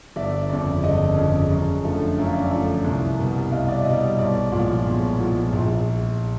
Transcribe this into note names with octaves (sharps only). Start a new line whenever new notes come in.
G1 D5 E5
F2 C#3 D5
G1 D#5
F2 C#3
F#2
D3 F3 A3
F#2 E5
F5
D5 E5
D3 F3 A3
C2
B2 G3
C2 D#5 F5
D5 E5
B2 G3 D#5
B1 D5
A#2 F3 G#3
B1
A#2 F3 G#3
A#1